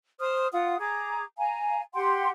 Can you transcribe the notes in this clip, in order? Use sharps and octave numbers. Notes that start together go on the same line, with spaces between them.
C5 D#6 F6
F4 F#5 D#6
G#4 A#5 D6
F5 G#5 A#5
G4 F#5 G5 C6